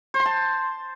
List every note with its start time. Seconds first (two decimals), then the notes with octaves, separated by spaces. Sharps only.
0.14 C5
0.20 C6
0.26 A5